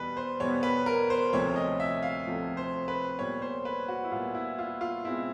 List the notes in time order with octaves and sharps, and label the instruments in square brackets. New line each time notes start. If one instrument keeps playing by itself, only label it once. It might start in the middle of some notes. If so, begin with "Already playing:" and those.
Already playing: [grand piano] E2 B2 G3 B3 B4
C5
E2 B2 G3 B3 C#5
B4
A#4
C5
D2 C3 F3 A3 C#5
D#5
E5
F5
D2 C3 F3 A3
C5
B4
A#2 G3 B3 C#5
C5
B4
F#4
E4
A#2 G3 B3 F4
E4
F4
F4
B2 G#3 C4 E4